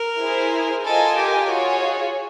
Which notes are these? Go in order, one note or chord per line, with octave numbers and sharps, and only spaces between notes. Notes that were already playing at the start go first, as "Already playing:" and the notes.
Already playing: A#4
E4 G#4 C5
F4 A4 A#4 D#5 G#5
G4
F4 F#4 G#4 C#5